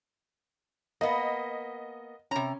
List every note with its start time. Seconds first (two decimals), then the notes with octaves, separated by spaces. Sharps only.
1.01 A#3 B3 D#5
2.31 C3 C#4 A#5